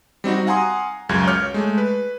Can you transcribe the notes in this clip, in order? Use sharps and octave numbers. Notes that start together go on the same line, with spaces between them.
G3 C4 D#4 F#4
F5 F#5 G#5 A#5 C6 D#6
C#2 F#2 C#3 F#3 G#6
C#5 D6 F6 G6
G#3 A3
B4